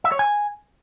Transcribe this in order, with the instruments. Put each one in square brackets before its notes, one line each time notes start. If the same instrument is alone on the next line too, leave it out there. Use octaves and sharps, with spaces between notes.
[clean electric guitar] E5
C#5
G#5